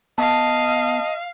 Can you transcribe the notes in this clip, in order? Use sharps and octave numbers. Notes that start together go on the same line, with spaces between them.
B3 D#5 F5 A5